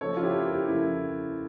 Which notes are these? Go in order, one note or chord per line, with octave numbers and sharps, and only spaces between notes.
C#3 F3 A3 A4 C#5
F4
E4 G4
G4 A#4
C#3 F3 A3 E4